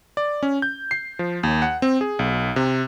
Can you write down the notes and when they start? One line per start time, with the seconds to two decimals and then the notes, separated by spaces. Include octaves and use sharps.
0.17 D5
0.43 C#4
0.62 G6
0.91 C7
1.19 F3
1.43 D#2
1.62 F#5
1.82 C4
2.01 G#4
2.19 B1
2.56 C3